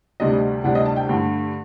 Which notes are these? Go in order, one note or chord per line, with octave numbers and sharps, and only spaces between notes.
D2 C3 G3 D4 D#5
D2 C3 G3 D4 F#5
D#5
A5
G5
G2 D3 A3